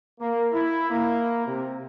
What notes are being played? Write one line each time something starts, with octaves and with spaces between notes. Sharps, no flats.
A#3
E4
A#3
C3